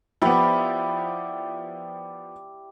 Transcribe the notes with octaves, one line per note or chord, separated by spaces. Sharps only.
F3 B3 E4 G4 D5